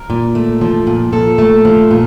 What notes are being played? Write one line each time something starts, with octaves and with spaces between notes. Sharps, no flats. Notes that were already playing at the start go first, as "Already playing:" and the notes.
Already playing: A#4
A#2
A3
F3
A#2
A#2 A4
A3
F3
A#2